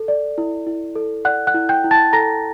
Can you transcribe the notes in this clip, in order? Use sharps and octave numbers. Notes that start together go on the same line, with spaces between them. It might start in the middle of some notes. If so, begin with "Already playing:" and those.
Already playing: A4
D5
E4
E4
A4
D5 F#5 F#6
F#5 F#6
E4
G5 G6
E4
A5 A6
A4 A#5 A#6